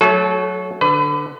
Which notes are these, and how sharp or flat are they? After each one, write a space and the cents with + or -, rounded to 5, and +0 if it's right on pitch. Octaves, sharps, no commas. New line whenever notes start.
F#3 +0 A3 +0 A4 -30
D3 +10 B4 +30